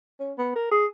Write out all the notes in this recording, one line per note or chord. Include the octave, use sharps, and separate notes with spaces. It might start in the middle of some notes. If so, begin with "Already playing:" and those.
C#4
B3
A#4
G#4